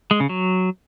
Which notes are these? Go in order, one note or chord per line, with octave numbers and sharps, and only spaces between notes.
G#3
C#3
F#3